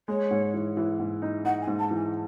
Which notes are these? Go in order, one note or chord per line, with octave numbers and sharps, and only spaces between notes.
G#3 C#5
G#2
E3
E3
G#2
D#4
D#4 F#5
G#5
G#2
A5
E3
G#5